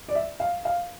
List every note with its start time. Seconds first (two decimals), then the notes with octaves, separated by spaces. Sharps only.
0.08 D5
0.15 E5
0.40 F5
0.65 F5